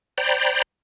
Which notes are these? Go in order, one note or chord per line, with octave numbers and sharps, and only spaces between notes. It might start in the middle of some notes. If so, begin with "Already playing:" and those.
C5 D5 G5 A#5 B5